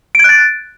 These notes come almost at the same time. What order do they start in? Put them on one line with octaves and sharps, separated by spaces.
D7 G#6 F#6 A6